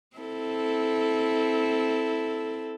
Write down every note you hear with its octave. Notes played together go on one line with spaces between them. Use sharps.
C4 E4 A4